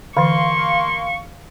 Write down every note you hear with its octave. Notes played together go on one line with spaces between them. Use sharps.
D3 E3 A#3 F5 C6 C#6